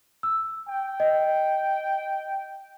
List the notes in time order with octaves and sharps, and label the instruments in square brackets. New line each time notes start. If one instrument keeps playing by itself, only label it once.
[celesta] E6
[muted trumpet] G5
[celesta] D#5